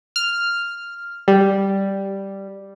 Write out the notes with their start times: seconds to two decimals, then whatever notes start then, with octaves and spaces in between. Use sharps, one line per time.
0.16 F6
1.28 G3